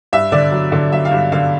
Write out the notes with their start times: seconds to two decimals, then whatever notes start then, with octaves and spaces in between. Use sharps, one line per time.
0.13 G2 E5
0.32 D3 D5
0.51 F#3
0.72 D3
0.91 F#3 E5
1.05 F5
1.11 G2
1.32 D3 F5